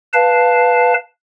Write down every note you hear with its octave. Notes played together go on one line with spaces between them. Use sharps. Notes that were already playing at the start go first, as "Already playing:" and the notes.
B4 F5 A5